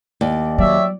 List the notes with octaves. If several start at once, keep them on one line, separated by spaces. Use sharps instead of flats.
D#2 D5
F#3 A#3 G4 C#5 D5 E5